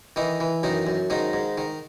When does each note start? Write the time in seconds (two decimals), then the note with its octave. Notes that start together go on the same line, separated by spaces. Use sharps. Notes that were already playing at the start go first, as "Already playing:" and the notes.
0.16 D#3 E3 D#4
0.40 E3
0.63 F#2 D#3 D#4
0.87 F#2
1.10 G#2 D#3 D#4
1.33 G#2
1.58 D#3